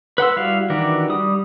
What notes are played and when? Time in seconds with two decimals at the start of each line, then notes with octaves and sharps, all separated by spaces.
0.18 B4 F#5 C6 E6
0.37 G3 E4 F#4 F5
0.70 D#3 E3 D4 F#4 G4
1.10 G3 D#6